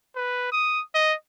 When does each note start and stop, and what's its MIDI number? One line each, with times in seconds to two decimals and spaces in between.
0.16 0.50 71
0.52 0.82 87
0.95 1.14 75